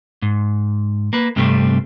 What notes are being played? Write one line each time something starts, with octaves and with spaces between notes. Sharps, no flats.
G#2
A#3 B4
G2 C3 G3 A3 C4